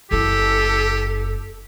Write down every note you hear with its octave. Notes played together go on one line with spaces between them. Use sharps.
F#1 E4 G4 A4